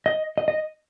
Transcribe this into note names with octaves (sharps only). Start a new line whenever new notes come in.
D#5
D#5
D#5